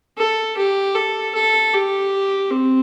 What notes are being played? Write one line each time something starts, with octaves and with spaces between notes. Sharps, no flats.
A4
G4
A4
A4
G4
C4